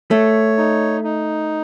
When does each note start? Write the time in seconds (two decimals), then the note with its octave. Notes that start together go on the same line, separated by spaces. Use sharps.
0.11 A3 C#5
0.57 D#4
1.04 D#4